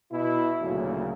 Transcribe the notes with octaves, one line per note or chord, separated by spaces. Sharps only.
B2 E4
D2 A#2 C#3 F#3 A#3